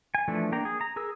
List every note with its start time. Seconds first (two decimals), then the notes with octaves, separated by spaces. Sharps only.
0.15 G#5
0.28 E3 F3 A3 D4
0.52 A#3 D4 G5 A#5
0.65 G#4
0.81 A#5
0.96 G#4 A#4 E6